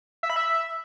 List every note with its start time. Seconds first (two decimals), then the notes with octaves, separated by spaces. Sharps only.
0.23 E5
0.30 B5
0.36 E5